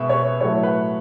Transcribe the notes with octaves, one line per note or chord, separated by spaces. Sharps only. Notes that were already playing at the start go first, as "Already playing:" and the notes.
Already playing: B2 G#3 B4 E5
C#5
A2 F#3 A3 C#5
B4